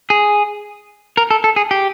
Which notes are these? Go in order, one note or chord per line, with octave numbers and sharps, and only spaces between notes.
G#4
A#4
A4
A4
G#4
G4